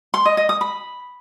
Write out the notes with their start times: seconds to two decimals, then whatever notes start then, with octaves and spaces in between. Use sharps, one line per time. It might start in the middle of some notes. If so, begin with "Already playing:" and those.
0.14 C6
0.26 D#5
0.37 D#5
0.49 D#6
0.61 B5